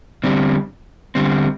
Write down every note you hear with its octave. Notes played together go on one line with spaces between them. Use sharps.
D3 G3 C4
D3 G3 C4